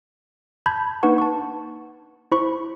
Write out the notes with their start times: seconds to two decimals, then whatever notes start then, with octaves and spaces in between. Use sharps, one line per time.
0.66 A5 B5 G6 G#6
1.03 A#3 D4 D#4 B4 F#5 C#6
1.18 A5 C#6
2.32 E4 C5 B5 C#6